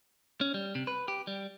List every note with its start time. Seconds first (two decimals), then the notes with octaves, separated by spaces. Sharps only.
0.41 C#4
0.54 G3
0.75 C3
0.87 B4
1.08 G4
1.27 G3